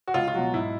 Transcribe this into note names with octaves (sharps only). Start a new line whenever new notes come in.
F#4
C#2 F4
F4
B2 F#3 F#4
G#2 E4